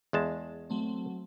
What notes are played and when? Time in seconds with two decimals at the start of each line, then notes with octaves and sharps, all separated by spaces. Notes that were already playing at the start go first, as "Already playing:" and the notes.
0.13 E2 G#3 A5
0.70 F#3 A3 C4